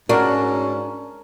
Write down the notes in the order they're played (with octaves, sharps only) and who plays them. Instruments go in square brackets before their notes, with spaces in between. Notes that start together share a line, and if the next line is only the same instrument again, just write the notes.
[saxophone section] G#2 C#4 [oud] D4 F#4 [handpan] A#4